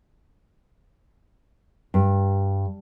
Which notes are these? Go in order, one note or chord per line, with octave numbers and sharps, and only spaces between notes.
G2